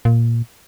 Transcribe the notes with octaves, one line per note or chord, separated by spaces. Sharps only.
A#2